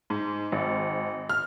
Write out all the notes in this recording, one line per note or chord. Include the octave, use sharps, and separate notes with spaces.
G#2
G#1
F6